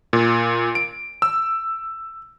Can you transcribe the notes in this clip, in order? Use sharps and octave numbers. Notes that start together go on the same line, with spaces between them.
A#2
D7
E6